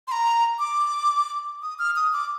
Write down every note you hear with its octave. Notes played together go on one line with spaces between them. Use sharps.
C6
A#5
D6
D#6
F6
D#6
D6